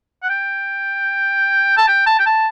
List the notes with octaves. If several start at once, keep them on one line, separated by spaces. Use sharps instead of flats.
F#5
G5
A5
G5
A5
G5
A5